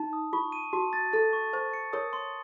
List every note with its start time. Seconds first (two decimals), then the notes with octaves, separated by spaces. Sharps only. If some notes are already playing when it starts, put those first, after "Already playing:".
Already playing: D#4 A5
0.13 D#6
0.33 F4 C#6
0.52 D#7
0.73 F#4 A5
0.93 A6
1.13 A4 A6
1.33 C#6
1.53 C5 C#6
1.73 C#7
1.93 A#4 C#5 D#6
2.13 C6